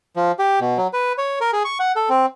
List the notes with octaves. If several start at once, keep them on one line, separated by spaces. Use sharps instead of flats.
F3
G4
B2
F#3
B4
C#5
A#4
G#4
C#6
F#5
A4
C4